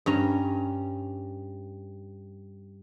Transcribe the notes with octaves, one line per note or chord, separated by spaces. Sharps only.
G2 C#4 A#5